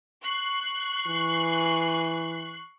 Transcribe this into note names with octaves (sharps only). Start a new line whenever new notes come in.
C#6 F#6 C7
E3